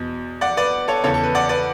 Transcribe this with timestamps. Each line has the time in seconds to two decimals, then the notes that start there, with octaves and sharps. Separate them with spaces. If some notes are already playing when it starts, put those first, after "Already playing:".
Already playing: E2 B2
0.41 D5 F#5
0.57 B4 D5
0.88 A4 C#5
1.03 E2 C#3 E3 A4 C#5
1.14 A4
1.24 B4
1.35 D5 F#5
1.49 B4 D5